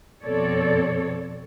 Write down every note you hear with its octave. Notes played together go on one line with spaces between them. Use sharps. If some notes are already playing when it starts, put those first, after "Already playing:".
F2 B2 C4 A4 C#5 D5